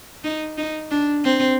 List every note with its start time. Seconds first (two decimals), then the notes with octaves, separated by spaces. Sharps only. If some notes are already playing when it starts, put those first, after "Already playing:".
0.24 D#4
0.58 D#4
0.91 D4
1.24 C4